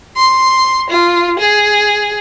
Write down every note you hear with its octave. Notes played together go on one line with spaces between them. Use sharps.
C6
F4
G#4